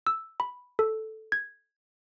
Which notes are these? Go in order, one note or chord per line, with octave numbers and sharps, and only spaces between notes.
E6
B5
A4
G#6